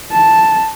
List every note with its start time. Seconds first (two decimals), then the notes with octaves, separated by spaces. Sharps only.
0.12 A5